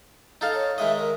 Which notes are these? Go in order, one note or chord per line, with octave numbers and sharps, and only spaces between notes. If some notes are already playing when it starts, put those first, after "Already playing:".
D#4 A4 F5
C#5
D#3 G#3 D#5 E5
A#4